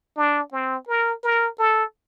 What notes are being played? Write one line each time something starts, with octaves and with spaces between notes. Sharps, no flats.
D4
C4
A#4
A#4
A4